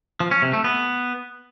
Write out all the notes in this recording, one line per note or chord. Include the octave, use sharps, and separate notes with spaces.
F3
C#4
C3
A3
B3